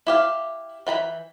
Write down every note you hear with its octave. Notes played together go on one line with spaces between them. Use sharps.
E4 G4 F5
E3 G5 A#5 B5